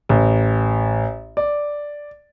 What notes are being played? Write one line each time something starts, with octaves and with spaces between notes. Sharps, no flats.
A1
D5